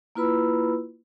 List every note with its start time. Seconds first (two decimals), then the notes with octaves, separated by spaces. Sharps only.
0.15 A#3 E4 F4 B4 B5 E6